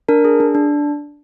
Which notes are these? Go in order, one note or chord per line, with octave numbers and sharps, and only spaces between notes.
D4 A#4
G#4
D4
D4